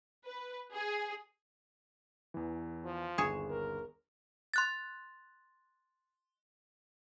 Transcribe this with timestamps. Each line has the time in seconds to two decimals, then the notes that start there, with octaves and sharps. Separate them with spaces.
0.25 B4
0.74 G#4
2.34 E2 E3
2.84 F3
3.18 G1 D#2 G#4 C#5 E7
3.49 A#4
4.54 C6 F#6 A6